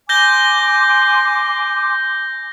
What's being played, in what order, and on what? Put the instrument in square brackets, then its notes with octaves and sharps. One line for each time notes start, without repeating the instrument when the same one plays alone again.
[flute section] G#5 C6 D6 [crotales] G6 A#6 G7